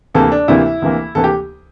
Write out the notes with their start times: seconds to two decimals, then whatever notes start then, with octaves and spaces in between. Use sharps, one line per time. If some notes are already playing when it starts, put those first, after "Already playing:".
0.14 D2 C3 E3 A#3 A4
0.32 D4
0.48 D2 C3 E3 A#3 E4
0.82 D2 C3 E3 A#3
1.15 D2 C3 E3 A#3 A4
1.24 G4